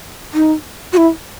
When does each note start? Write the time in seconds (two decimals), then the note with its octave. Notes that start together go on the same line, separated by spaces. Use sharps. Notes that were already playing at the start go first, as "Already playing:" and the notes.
0.34 D#4
0.93 F#4
0.97 E4